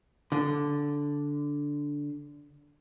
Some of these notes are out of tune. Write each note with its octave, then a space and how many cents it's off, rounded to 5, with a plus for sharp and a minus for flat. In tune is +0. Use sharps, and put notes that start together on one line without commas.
D3 -10